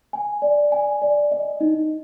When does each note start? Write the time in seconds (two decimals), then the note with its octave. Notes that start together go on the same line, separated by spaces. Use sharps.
0.13 G#5
0.42 D5
0.72 G#5
1.02 D5
1.32 D#5
1.61 D#4